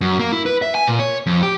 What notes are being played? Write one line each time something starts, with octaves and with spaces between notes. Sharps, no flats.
F#2
A#3
E4
B4
E5
G#5
A#2
C#5
F2
G4